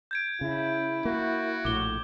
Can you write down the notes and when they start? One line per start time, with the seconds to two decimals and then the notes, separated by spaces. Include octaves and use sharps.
0.11 G6 G#6 D7
0.41 C#3 E4
1.05 A#3 F#4
1.65 A#1 A2 D6 G7